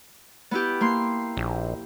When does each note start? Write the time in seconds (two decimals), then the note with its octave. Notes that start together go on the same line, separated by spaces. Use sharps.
0.51 B3 E4 G4
0.81 A#3 C6
1.37 A#1